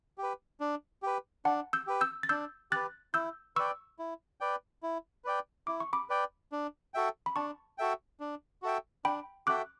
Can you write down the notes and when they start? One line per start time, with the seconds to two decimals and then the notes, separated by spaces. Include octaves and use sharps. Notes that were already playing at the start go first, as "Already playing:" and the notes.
0.18 G4
0.23 B4
0.60 D4
1.03 G4 B4
1.45 D4 F#5 A5
1.73 E6 G6
1.87 G4 B4
2.01 E6 G6
2.23 A6
2.29 D4 E6 G6
2.71 G4 B4 F#6 A6
3.14 E4 E6 G6
3.56 B4 D5 G5 C#6 E6
3.99 E4
4.41 B4 D5 G5
4.83 E4
5.25 B4 D5 G5
5.67 E4 D6
5.80 C#6
5.93 B5 D6
6.09 B4 D5 G5
6.52 D4
6.94 F#4 A4 E5 G5
7.26 B5
7.36 D4 A5 C#6
7.78 F#4 A4 E5 G5
8.20 D4
8.62 F#4 A4 E5 G5
9.05 D4 G5 B5
9.47 F#4 A4 E5 G5 D6 F#6